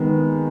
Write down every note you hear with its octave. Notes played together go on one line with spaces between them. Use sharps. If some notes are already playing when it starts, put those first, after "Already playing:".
Already playing: D#3 G#3 B3